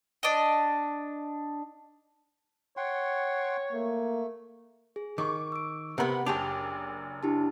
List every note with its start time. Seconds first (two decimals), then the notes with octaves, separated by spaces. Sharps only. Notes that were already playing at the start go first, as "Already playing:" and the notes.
0.23 D4 D#5
2.77 C#5 F#5 G5 C6
3.73 A3 A#3
4.96 G#4
5.18 D#3 C#6 D6
5.52 E6 D7
5.98 C3 B3 A#4 F#5 B5
6.26 F#1 D4 G4 G#4 D6 F7
7.23 D4 E4 G4 A5